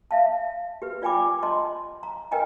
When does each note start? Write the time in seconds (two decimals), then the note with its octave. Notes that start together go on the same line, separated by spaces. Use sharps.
0.11 E5 F5 A5
0.82 G4 B4
1.02 F4 D5 G5 G#5 B5 D6
1.43 D#5 A5 C6
2.03 A#5
2.31 A#4 B4 D#5 G5 G#5 A#5